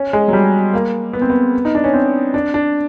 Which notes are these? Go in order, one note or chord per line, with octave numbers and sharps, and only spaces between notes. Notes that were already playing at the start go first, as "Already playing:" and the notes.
Already playing: C#4
G#3
F#3
G3
A#3
B3
C4
B3
D#4
D4
C#4
C4
D4
D4